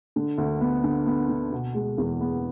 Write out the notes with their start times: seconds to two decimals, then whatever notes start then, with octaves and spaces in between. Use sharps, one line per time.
0.16 D3
0.38 D2
0.61 B3
0.84 D3
1.06 B3
1.29 D3
1.52 B2
1.75 G#3
1.98 E2
2.21 B3